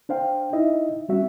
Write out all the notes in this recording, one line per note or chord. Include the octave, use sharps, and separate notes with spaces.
D4 C5 F5 G5
D#4 E4 D#5 E5
G3 C4 C#4 F#4 E5